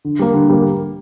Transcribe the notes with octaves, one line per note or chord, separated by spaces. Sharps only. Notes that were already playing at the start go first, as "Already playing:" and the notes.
D3
G3 A#3
D3
G3 A#3